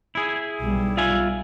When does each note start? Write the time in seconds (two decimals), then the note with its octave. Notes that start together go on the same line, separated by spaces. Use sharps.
0.15 E4 G#4
0.62 B1 G3
0.97 F4 E5 G#5